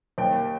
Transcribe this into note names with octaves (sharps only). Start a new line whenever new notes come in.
D#2 G5